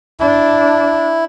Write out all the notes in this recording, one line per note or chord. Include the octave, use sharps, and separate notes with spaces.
D4 E4